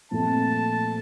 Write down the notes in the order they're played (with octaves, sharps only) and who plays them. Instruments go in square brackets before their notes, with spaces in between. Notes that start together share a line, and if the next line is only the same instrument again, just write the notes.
[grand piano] A#2 F3 A3 C4 [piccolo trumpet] A5